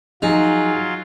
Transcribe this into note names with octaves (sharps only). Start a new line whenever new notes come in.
F3 F#3 D#4 F4 G#4